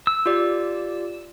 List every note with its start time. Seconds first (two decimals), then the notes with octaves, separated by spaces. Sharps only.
0.07 E6
0.26 F4 G4 D5